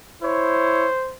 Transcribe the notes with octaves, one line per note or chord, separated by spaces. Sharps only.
E4 C5 C#5